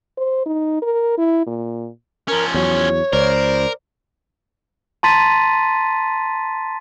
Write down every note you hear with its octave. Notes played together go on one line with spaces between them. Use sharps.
C5
D#4
A#4
E4
A#2
F3 C#4 A#4
E2 F#3 C#5
C#2 A#4 C5 D5
A5 A#5 C6 A6 B6 D#7